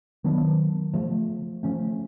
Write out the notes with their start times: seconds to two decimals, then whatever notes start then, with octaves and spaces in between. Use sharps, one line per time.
0.24 D#3 F#3 B3 D4
0.94 C#3 F3 A3
1.63 C#3 F3 A3 C#4